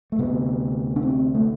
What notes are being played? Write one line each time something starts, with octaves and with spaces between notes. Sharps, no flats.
A3
D2 C3 B3
D4
C4
A3